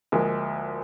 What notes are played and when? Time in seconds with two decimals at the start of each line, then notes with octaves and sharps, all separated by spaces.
0.12 D2 F3 G#3 A#3